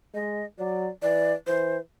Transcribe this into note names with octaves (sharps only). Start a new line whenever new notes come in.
G#3 D#5
F#3 D5
E3 D5
E3 C5